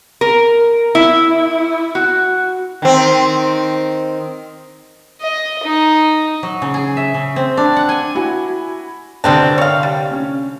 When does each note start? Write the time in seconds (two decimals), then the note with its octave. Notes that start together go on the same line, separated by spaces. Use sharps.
0.21 A#4
0.95 E4
1.95 F#4
2.82 D#3 C4
5.21 D#5
5.64 D#4
6.43 F#3
6.62 C#3
6.74 G#4
6.97 E5
7.14 C#3
7.36 C4
7.57 D4
7.76 F#5
7.89 G#5
8.15 E4 F#4 G#5
9.24 C2 B2 D3 C4 D4
9.58 C#5 F5
9.83 G3
10.11 C#4